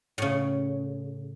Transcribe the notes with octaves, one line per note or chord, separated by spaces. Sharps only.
A2 C#3